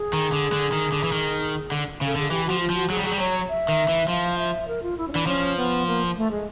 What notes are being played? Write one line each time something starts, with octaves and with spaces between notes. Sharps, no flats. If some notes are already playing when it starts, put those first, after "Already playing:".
Already playing: G#4
D#3
D3
D3
D#3
D3
E3
D#3
D3
C#3
A4
D3 G#4
E3 G4
F3 F#4
F4
F3 F#4
F#3 G#4
G3
F#3 G#4
G3
F#3 C#5
E5
D#3
E3
F3 F5
E5
A#4
F4
E4
C#4
E3 D4
F3 C#4
B3
A#3
A3
G#3